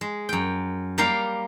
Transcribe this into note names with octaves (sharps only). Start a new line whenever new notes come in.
G#3
F#2 G5
G3 A#3 A#4 F5 G5 C6